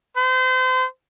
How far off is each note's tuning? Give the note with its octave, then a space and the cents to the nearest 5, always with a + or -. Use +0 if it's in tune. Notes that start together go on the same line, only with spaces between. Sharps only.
C5 -35